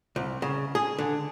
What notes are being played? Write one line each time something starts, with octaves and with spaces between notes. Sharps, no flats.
C2
C#3
G#4
D3